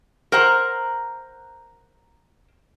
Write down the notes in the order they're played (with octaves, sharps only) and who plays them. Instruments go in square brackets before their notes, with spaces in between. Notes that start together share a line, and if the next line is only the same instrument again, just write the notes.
[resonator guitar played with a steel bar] A#4 C5 F#5 A#5